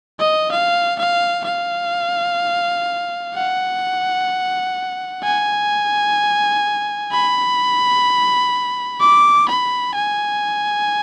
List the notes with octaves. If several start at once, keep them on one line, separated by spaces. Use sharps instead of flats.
D#5
F5
F5
F5
F#5
G#5
B5
D6
B5
G#5